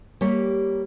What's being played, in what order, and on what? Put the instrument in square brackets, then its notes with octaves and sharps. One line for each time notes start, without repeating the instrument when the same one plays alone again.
[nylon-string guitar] G3 A#3 G4 A#4 C#5